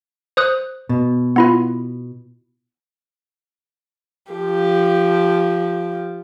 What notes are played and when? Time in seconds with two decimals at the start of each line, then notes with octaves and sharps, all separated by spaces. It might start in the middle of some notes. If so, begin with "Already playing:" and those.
0.37 C5 D#6 F#6
0.89 B2
1.36 B3 E4 F4
4.32 F3 G4